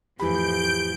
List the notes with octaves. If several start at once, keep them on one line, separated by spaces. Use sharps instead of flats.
F2 A2 E3 F3 G4 B5 G6 D7